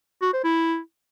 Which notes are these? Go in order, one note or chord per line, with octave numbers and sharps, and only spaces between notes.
F#4
C5
E4